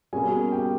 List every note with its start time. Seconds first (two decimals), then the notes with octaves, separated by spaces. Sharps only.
0.13 B2 G3 A#3 C#4 G#4 G#5
0.52 G4 G5